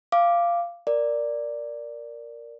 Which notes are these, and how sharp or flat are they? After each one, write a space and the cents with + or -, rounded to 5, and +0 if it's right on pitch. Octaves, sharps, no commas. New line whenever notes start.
F5 -15 D6 +0
A#4 +0 D5 +0